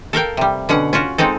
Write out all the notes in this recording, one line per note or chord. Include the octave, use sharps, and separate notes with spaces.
A4 A#4 F5 G5
C3 G3
B2 D3 C#4 F#5
C#4 F4 F#4
G#3 C4 D#4 A4